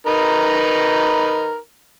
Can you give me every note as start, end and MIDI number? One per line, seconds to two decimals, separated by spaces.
0.07 1.56 63
0.07 1.56 70
0.07 1.56 71